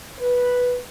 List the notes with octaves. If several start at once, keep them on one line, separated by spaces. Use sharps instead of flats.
B4